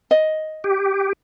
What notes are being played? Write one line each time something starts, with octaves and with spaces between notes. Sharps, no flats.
D#5
G4